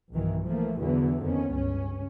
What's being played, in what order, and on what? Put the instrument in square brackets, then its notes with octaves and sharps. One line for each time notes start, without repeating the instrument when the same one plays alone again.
[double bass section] B1 G2 D#3 E3 F#3
E3 F3 A3 A#3
E2 D3 E3 F#3 B3
F2 D#3 B3 C#4
C#2 G2 C#4